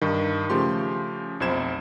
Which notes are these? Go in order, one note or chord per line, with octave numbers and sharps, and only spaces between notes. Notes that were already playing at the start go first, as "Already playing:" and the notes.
G2 D#3
C#3 F3 A3 G4 C6
B1 F2 C5 G#6 E7